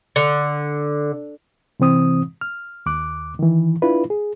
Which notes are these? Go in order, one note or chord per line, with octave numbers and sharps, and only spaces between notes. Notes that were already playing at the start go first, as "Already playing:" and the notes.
D3
C3 E3 C4 D#6
F6
D#2 D6 F#6
D#3 E3
D4 E4 F4 B4
G#4